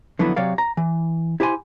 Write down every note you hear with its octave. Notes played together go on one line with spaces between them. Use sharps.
D3 F3 F#3 B3 E4
C3 F#3 C#5 D5 F5
A#5
E3
E4 G4 C5 F#5 G#5 C6